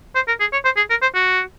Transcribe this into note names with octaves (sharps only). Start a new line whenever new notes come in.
C5
A#4
G#4
C#5
C5
G#4
A#4
C5
F#4